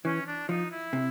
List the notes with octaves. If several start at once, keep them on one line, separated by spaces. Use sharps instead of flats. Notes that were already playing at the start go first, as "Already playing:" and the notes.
E3 C#4
D4
F3 D#4
E4
C3